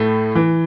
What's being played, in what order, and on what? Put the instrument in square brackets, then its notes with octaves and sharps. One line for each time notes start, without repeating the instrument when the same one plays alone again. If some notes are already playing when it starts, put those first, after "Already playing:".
Already playing: [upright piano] A2 A3
E3